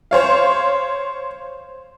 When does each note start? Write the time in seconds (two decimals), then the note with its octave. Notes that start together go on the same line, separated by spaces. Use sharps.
0.11 C5 C#5 F5